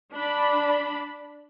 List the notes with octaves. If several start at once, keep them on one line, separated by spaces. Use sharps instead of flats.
D4 B5